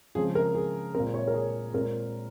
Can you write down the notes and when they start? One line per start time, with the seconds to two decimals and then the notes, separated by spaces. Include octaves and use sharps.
0.15 C#3 F3 G#3 C4 G#4
0.35 A#4
0.55 G#4
0.94 A#2 G#3 C4 A#4
1.14 C#5
1.28 A#4
1.34 G#4
1.73 A#2 G#3 C4 A#4